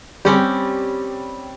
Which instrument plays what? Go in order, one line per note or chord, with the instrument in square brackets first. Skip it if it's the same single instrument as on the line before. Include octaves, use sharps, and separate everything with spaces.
[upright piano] G3 [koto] C4 C#4 G4